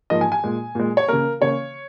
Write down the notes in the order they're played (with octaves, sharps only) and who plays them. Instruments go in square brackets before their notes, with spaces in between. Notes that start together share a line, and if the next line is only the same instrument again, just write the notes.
[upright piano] G#2 F3 A#3 D#5
G#5
G#5
A#2 G#3
A#2 G#3
C#5
C#3 A#3 A#4
C#3 A#3 C#5